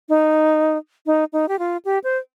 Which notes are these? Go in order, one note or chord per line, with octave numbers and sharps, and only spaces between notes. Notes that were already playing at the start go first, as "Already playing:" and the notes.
D#4
D#4
D#4
G4
F4
G4
C5